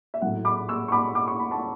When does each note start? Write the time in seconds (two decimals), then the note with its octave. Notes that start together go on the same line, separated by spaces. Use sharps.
0.14 E5
0.22 A2 F#3 F#5
0.45 B5 D6
0.68 C#6 E6
0.88 C#6
0.92 B5 D6
1.15 D6
1.28 C#6
1.39 B5
1.51 A5 C#6